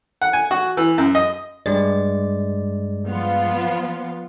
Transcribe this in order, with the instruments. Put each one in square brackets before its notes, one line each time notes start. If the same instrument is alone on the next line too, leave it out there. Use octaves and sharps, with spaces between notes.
[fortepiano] F#5
G#5
F#4
E3
F#2
D#5
[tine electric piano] G2 G#3 A6 [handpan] D5
[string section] F3 B3 F4